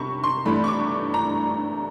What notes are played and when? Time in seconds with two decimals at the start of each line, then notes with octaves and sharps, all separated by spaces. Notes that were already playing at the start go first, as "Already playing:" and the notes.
Already playing: C3 B5 C#6
0.23 C6
0.45 G2 E3 A3 D4 B5
0.64 C#6
0.68 D6
1.14 A#5